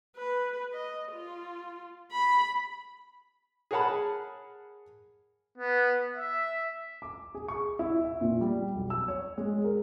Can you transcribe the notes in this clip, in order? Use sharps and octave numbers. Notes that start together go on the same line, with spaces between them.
B4
D#5
F4
B5
G#4 A#4 C#5 F#5 A5 B5
B3
E5
D6
G#4
C#6
E4
E5
A#2
G3
B1
E6
C#5
G#3
A#4